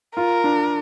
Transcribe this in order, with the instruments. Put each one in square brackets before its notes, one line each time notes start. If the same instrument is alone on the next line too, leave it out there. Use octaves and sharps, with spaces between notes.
[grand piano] F4 [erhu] A#4
[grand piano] D4